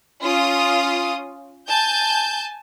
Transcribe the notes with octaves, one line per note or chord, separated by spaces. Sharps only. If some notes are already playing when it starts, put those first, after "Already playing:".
C#4 F4 D#6
G#5 A5 G6